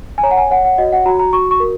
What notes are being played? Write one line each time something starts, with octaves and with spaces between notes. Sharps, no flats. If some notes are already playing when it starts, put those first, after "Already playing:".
G#5
C#5 A#5
F#5
G#5
C#5 F#5
F#5
F#4 D#5
F#5
F#4 A#5
A#5
F#4 C#6
C#6
A#4